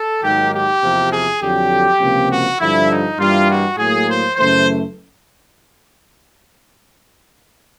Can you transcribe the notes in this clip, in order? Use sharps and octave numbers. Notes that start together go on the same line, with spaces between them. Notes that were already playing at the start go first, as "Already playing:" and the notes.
Already playing: A4
G#2 D#3 F#3 A#3 G4
G4
E2 C3 F3 A#3
G#4
F2 D3 F#3 G4
C#2 C3 F3 A#3
F#4
G2 D3 F3 E4
D#4
G2 E3 G3 A#3 F4
F#4
A2 F#3 A#3 G#4
C5
F#2 C#3 E3 A3 C5